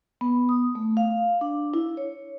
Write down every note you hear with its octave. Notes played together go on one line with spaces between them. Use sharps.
B3
D#6
A3
F5
D4
E4
C#5